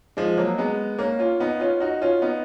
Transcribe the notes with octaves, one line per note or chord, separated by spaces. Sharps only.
F3 G#3
F#3 A#3
G#3 B3
A#3 C#4
C#4 F4
B3 D#4
C#4 F4
D#4 F#4
C#4 F4
B3 D#4